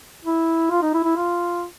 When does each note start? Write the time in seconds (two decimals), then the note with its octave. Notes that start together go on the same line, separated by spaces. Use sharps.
0.25 E4
0.71 F4
0.82 D#4
0.94 E4
1.04 E4
1.17 F4